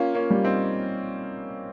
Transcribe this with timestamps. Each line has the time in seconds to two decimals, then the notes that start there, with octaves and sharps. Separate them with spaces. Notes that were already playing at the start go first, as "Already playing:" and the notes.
Already playing: A#3 C#4 F4
0.15 A#3 C#4
0.30 G3
0.45 C4 D#4